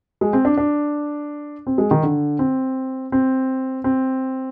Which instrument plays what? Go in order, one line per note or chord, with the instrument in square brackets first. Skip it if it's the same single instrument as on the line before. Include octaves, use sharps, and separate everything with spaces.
[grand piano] G#3
C4
D4
D4
C4
G#3
D#3
D3
C4
C4
C4